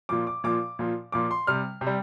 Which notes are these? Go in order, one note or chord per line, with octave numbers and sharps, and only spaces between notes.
A#2 F3 D6
D6
A#2 F3 D6
A#2 F3
A#2 F3 D6
C6
C3 G3 F6
C3
G3